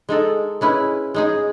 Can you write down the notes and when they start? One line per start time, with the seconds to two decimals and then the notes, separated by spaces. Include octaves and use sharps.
0.09 G#3 D#4 A4
0.61 G#3 C#4 E4 B4
1.14 G#3 D#4 G#4